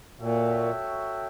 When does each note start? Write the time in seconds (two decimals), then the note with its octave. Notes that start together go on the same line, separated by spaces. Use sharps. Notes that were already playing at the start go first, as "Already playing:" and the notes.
0.18 A#2 F#4 A4 C#5 E5 G5